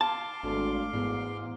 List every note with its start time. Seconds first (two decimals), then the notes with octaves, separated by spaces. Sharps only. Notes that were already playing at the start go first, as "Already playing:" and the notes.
0.01 F5 A5 C6 D6
0.43 G#1 D2
0.93 E2 G#2